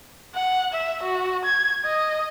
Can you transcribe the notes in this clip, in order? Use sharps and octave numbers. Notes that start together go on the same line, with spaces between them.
F#5
E5
F#4
G#6
D#5